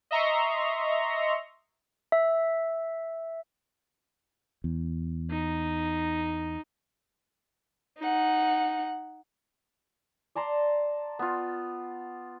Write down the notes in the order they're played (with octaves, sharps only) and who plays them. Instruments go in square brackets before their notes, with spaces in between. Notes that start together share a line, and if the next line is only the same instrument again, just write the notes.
[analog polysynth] D#5 E5 A#5 C6 C#6
[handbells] E5
[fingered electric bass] E2
[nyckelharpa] D#4
[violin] D#4 F#5
[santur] D5 A5 A#5 C6
B3 F4